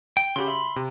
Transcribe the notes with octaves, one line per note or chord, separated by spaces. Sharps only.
G5
C#3 F#4 G4 B5 C6
E5
C3